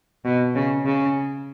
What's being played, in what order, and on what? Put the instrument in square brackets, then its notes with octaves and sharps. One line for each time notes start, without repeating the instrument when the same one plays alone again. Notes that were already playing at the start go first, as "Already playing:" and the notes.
[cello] B2
C#3
C#3